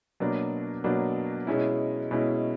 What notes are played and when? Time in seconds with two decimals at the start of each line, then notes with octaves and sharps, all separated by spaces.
0.20 B2 F#3 A#3 D4
0.84 B2 F#3 A#3 D4
1.47 B2 G#3 C#4 E4
2.11 B2 G#3 C#4 E4